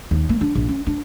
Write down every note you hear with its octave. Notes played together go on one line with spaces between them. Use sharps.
D#2
A#3
D4
A#1
C#4
D4